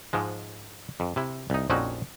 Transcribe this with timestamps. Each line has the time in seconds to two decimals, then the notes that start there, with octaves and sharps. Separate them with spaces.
0.13 G#2 F3 G#3
1.00 F2
1.16 C3 E4
1.50 C2 D#4
1.70 A#1 F2 C4 C#4 D#4 F#4